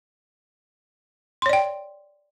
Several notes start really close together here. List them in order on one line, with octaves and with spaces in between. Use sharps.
C6 C#5 D5 G5